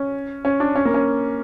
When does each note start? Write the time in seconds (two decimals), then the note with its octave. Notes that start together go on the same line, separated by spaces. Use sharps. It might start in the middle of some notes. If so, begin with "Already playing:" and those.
Already playing: C#4
0.45 C#4
0.60 D4
0.76 C#4
0.85 A#3
0.94 C#4